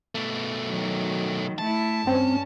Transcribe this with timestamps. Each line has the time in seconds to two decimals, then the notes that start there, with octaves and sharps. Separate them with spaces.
0.15 B2 A3
0.67 D#3 F#3
1.58 A3 E4 A5
2.07 G2 C4 C#4